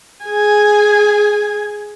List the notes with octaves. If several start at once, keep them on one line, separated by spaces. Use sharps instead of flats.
G#4 G#5